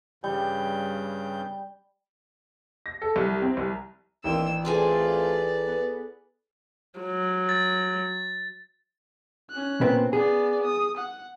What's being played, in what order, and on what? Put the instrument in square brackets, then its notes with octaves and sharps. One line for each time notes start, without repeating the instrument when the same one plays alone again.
[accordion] G2 C#3 G6 [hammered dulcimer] G3
[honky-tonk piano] A#6
A4
C2
C4
C2
[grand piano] A1 D4 G5 [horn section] D#3 A#3 C4 [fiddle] E6
[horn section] A3 C4 F4 [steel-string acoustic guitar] G#4 A4 G#5 [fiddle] B4 D5
[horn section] B3
[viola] F#3
[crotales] A6
[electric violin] C#4 F#6
[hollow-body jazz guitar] A#2 B3 C4
[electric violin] B3 D5 [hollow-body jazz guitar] G#4
[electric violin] D#6
F#5